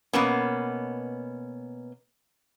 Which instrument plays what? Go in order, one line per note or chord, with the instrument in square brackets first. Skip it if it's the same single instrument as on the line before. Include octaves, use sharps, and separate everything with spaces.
[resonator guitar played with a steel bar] B2 A#3 B3 C#4